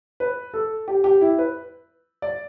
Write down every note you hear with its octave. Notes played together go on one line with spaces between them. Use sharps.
B4
A4
G4
G4
E4
B4
D5